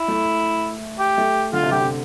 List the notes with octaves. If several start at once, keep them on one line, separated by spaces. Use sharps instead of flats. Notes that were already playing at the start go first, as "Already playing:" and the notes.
Already playing: E4
A3
G4
A3
D3 F4
C3
D3 G4
C3